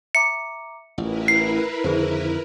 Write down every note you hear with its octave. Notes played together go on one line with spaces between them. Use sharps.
E5 A#5 D6 C#7
A1 E4 F4 A#4 B4
C7
F2 D3 D#3 G#4 C5